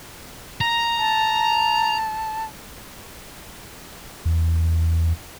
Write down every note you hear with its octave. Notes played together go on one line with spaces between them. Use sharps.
A#5
A5
E2